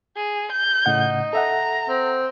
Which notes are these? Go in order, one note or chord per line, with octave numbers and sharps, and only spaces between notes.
G#4
G6
A2 C#3 D#4 F#5
A4 E5 F#5 A#5
C4